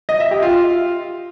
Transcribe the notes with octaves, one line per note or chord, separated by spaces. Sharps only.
D#5
E5
G4
F4